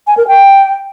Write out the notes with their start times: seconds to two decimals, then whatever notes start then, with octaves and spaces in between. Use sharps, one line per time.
0.07 G#5
0.17 A#4
0.28 G5